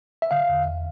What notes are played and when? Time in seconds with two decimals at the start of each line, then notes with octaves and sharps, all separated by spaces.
0.22 E5
0.31 D3 F5
0.49 E2
0.66 E2